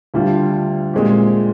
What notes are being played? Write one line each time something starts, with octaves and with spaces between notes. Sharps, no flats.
D2 D3 G3 D4 F4
A#2 G#3 C4 G4